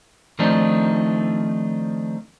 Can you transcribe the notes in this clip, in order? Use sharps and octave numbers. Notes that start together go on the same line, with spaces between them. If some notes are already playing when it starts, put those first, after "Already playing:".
D#3 F3 A3 C4 D4 D#4